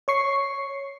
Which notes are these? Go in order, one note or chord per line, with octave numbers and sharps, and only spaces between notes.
C#5 C#6 C7